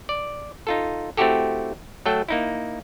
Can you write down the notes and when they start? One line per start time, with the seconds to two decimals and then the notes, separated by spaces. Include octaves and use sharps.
0.09 D5
0.67 D#4 F4 A4
1.17 A3 C4 E4 F#4 G4 A4
2.06 F#3 A3 A4 G5
2.29 A#3 D#4 E4